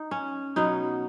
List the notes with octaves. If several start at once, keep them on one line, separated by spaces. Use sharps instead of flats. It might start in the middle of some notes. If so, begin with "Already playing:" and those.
Already playing: D#4
C#4
B2 F#3 B3 D#4